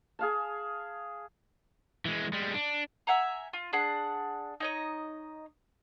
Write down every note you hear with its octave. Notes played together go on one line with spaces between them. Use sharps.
G#4 F5 A5
E3 G#3
G3 G#3
D4
E5 F#5 G#5 A#5
F4
D4 G#4 F#5
D#4 C#5 D#5